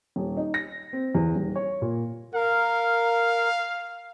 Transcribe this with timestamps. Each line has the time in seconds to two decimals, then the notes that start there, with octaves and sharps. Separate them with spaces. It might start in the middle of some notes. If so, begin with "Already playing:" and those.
0.16 D#1
0.37 D#4
0.54 A#6
0.93 C4
1.15 E2
1.36 D#1
1.55 C#5
1.82 A#2
2.34 A#4 F5